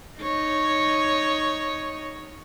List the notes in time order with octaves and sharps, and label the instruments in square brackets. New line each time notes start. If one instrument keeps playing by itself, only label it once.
[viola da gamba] D#4 C#5